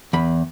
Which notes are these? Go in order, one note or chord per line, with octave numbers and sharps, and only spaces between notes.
E2 B5